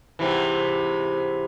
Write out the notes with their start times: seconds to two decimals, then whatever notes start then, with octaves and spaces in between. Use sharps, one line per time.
0.19 G#2 C3 E3